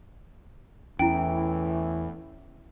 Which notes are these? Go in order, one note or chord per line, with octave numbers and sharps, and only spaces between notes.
E2 A2 E3 C#4 E4 G5